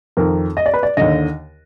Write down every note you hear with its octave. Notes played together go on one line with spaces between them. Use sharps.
F2 D#3 A#4
D#5
D5
B4
D5
D#2 D3 D#5